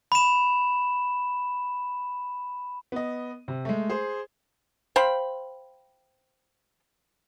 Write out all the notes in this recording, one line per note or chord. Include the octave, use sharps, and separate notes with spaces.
B5 E7
B3 D#5
C3
G#3 A3
G#4 C5
C5 F5 G5 B5